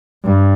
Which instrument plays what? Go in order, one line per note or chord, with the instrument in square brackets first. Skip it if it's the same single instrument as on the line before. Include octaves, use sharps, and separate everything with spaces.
[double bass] G2